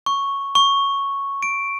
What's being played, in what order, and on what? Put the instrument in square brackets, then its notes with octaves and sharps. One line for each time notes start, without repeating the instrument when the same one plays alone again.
[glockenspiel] C#6
C#6
D7